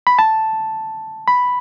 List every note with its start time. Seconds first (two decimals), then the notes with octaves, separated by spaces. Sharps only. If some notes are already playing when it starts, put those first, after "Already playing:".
0.07 B5
0.19 A5
1.28 B5